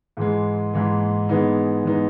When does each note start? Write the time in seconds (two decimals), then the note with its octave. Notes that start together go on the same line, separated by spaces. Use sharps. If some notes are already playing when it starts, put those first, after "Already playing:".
0.17 G#2 E3 G#3
0.73 G#2 E3 G#3
1.29 E3 G#3 B3 D#4
1.84 E3 G#3 B3 D#4